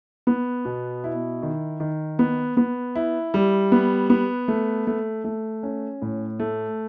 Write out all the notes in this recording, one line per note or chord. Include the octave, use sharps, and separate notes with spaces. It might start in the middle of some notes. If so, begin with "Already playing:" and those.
B3
B2
E4
D#3
D#3
B3
B3
E4
G3
B3
B3
A3
A3
A3
C#4
A2
A3